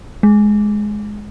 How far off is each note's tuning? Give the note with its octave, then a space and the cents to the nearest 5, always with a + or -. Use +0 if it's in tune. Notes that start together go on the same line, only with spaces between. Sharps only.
G#3 +10